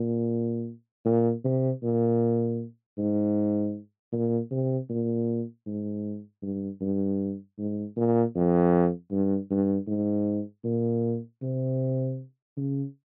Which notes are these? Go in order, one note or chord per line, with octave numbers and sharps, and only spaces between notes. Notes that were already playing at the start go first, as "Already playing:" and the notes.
Already playing: A#2
A#2
C3
A#2
G#2
A#2
C3
A#2
G#2
G2
G2
G#2
A#2
F2
G2
G2
G#2
A#2
C3
C#3